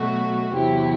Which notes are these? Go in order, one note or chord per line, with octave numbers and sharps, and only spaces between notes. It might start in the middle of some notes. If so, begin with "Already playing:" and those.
Already playing: B2 F#3 A3 F#4
E2 C3 F#3 C4 E4 G4